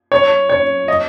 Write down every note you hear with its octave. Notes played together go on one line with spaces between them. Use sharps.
C#5
C#5
D#5